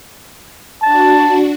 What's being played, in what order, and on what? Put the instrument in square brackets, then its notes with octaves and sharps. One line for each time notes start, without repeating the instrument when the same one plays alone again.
[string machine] D4 F#4 [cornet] A5